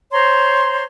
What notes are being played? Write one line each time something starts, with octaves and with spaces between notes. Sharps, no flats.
C5 C#5 A#5 C6